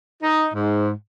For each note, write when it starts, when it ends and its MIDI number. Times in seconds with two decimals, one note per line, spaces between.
0.23 0.47 63
0.54 0.90 44